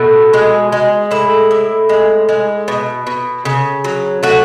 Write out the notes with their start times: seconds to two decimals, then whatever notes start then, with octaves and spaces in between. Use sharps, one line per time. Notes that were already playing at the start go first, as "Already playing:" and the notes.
Already playing: B2 A3 F#4
0.34 G#3
0.72 G#3
1.11 A2 E4
1.51 A2
1.89 G#3
2.29 G#3
2.68 B2
3.07 B2
3.45 C#3
3.84 F#3
4.23 A3 F#4